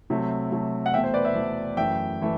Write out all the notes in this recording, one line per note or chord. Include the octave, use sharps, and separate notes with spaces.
C3 F#3 A3
C3 F#3 A3
F#5
E2 B2 A3 E5 G5
C5
B4 D5
C5 E5
E2 B2 A3
F#2 E3 A3 E5 G5
E3 A3